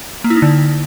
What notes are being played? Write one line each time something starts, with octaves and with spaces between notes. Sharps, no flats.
A#3
E4
D#4
D3